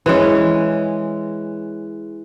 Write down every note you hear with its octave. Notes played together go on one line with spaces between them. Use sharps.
E3 G#3 C#4